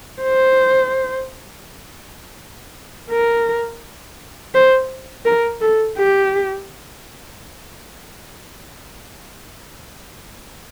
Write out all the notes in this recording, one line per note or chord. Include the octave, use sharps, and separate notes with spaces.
C5
A#4
C5
A#4
A4
G4